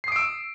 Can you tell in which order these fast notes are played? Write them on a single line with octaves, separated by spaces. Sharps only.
C7 D#6 D7 E6